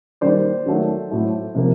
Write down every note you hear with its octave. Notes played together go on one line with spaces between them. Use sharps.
D#3 G3 A#3 C5 D5
D#3 F#3 A3
A2 F#3 A3
C3 F3 A#3